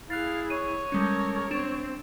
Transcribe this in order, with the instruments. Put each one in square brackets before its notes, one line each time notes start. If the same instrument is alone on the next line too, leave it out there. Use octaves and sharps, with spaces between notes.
[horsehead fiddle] E4 G#4 [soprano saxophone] F5 [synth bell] F#6 A6
[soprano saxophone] C#5 [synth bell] D#7
[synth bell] G3 G#3 C#4 [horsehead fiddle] A4 A#4
[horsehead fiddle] C4 [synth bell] D4 E7